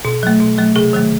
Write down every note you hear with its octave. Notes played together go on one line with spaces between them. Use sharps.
B2
F#3 A3
B2
F#3 A3
C3 G#4
D#3 F#3 A3